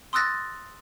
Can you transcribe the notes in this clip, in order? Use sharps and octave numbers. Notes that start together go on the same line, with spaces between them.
C6 D#6 E6 F#6 A6 A#6